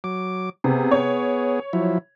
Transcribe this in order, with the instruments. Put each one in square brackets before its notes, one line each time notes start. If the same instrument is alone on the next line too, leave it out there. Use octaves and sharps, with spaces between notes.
[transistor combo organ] F#3 D6
[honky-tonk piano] C3 [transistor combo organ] B3 G#4
[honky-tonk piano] C#5
[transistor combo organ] F3 F#3 E4